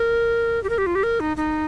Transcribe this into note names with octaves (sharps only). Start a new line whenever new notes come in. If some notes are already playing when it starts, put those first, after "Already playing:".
Already playing: A#4
G4
A#4
G4
F4
G4
A#4
D#4
D#4